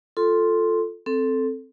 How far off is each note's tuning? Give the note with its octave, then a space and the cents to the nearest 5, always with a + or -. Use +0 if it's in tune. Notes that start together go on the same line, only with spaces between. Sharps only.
F4 +5 A4 +0 C6 +0
C4 +0 A4 +0